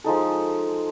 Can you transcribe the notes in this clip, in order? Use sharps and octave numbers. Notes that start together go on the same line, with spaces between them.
F3 G#3 D#4 A4